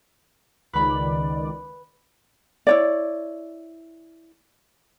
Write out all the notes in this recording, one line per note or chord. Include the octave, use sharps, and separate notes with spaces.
C#2 D#3 B4 D5 B5
E4 C#5 D5